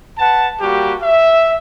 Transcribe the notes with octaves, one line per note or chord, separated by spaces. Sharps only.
B4 F#5 A5
G3 A#3 F#4 G4
E5